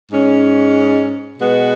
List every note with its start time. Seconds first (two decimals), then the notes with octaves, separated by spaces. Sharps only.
0.12 G#2 G#3 C#4
1.38 B2 G#3 B3 F#4 B4